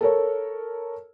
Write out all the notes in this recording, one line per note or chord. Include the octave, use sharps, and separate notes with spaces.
A4 A#4 C#5